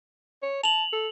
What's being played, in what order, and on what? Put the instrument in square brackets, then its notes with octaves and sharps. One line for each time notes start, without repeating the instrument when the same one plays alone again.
[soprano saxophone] C#5
[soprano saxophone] A5 [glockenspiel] F7 F#7
[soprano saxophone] A4